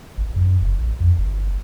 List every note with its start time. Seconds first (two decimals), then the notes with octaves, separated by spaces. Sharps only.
0.18 G#1
0.36 F#2
0.61 F#1
0.80 A1
1.00 F2
1.18 G1